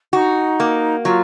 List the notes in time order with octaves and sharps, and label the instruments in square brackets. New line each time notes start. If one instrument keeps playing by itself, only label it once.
[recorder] D#4 [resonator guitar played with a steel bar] F#4
[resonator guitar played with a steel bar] A#3
[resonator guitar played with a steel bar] F#3 [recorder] F4